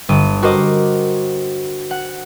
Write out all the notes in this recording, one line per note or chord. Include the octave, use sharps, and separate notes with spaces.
G1 D#7
F#4 A#4 C5 D#5 D6
F#5